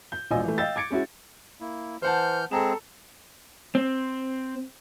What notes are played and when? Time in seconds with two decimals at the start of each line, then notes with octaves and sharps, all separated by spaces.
0.12 G6
0.31 E1 A#1 F4 D#5 G#5 E6
0.44 E3 A3
0.58 D#5 F5 G5 E6 G6 A6
0.76 D6 G#6 C#7 D7
0.90 G#3 C#4 E4 F#4
1.60 A#3 E4
2.02 E3 C5 F#5 A5 F6 G6
2.51 G#3 C4 G#4 A4 A#5 E7
3.75 C4